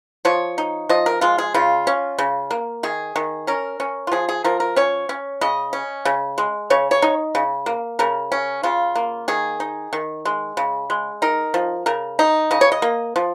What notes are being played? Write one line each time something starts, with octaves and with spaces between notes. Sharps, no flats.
F3 C#5
D#4
F3 D#5
A#4
G#3 F4
G#4
C#3 F4
C#4
C#3
A#3
D#3 G#4
D#3
C#4 A#4
C#4
F4
F3 G#4
G#4
F3 A#4
A#4
C#4 C#5
C#4
C#3 D#5
C#4
C#3
G#3
C#3 C#5
C#5
D#4
C#3
A#3
C#3 A#4
C#4
C#3 F4
A#3
D#3 G#4
D#4
D#3
G#3
C#3
G#3
D#4 A#4
F3
C#3 A#4
D#4
C#3 D#5
C#5
D#5
A#3
F3